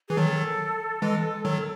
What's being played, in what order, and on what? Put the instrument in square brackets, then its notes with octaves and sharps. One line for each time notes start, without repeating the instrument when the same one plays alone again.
[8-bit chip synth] E3 [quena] G#4
[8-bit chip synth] D#3 F#3 [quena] A4
[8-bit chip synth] E3 G#3
D#3 F#3